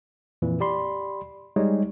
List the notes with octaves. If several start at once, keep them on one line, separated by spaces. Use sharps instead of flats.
F2 A#2 E3
G4 D5 B5 C6
G3 G#3 D#4 C#5